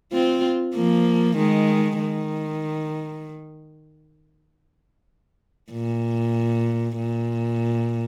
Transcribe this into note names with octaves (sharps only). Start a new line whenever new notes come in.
C4 F4
F3 A#3
D#3 G#3
D#3
A#2
A#2